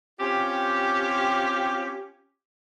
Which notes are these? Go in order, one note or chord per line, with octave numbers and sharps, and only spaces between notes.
C4 C#4 F4 G4